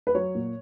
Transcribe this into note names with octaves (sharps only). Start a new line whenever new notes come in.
B4
F#3 C#5
A#2